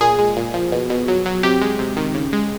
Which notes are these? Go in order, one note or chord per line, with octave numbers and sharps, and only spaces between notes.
A#2 G#4
G#3
A#2
F3
B2
B2
F#3
F#3
C3 G4
G#3
C3
D#3
C#3
G#3